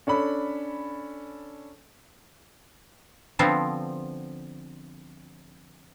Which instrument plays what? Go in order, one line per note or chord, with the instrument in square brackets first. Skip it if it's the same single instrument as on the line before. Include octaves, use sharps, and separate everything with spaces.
[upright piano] C#4 D4 A4 B5
[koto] D3 F3 B3 C4